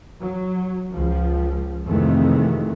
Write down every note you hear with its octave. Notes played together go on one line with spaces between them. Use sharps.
F#3
C#2 F3
F2 C3 D#3 E3 G#3 A3